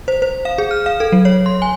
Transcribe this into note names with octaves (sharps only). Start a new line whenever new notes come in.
C5
C5
F5
G#4
F6
F5
A4
F#3
C#5
C6
G#5